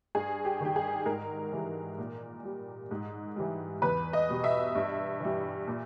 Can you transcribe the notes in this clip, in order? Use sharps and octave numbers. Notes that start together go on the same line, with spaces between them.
G2 G#4
G4
D#3 G3 G4
G#4
G#2 A#4
E3 G3
A#2
G3
G#2
E3 G3
E2 B4
D#5
B2 G3
E5
G2
E3 G3
A#2